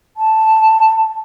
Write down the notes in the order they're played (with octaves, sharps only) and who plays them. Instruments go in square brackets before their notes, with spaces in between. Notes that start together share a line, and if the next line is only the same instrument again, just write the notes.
[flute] A5